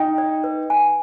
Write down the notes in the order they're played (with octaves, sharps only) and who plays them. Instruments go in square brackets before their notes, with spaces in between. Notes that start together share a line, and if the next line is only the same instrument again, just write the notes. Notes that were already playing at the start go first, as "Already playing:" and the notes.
Already playing: [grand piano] D#4 [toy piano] G5
[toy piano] D5
B4
G#5